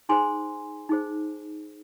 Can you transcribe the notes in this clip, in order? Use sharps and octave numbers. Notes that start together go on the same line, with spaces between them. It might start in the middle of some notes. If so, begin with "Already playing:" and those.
D#4 G#4 C5 G#5 C6
D#4 G#4 C5